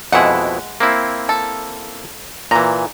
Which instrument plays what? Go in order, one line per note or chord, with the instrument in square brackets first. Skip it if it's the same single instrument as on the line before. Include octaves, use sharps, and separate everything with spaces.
[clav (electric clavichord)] F2 B2 E4 [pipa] G#3 F#5
[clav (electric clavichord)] A#3 C4 E4
[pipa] A4
[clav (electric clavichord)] A#2 E3 [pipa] A#5